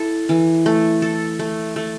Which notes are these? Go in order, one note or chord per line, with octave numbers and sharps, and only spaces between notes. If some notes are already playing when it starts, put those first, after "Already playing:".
Already playing: E4 A4
E3
A3
A4
A3
A3